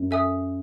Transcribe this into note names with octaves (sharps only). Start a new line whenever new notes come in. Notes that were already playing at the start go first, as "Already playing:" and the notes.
Already playing: F#2
A4 E5 G#5 D#6